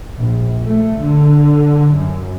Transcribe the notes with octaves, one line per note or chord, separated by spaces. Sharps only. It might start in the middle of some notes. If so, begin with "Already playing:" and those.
A#1
A3
D3
F#2